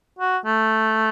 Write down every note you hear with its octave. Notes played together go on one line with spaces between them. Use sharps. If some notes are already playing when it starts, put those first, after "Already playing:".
F#4
A3